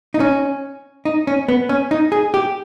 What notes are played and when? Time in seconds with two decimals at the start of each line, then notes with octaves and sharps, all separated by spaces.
0.14 D#4
0.20 C#4
1.05 D#4
1.27 C#4
1.48 B3
1.69 C#4
1.91 D#4
2.12 G#4
2.34 G4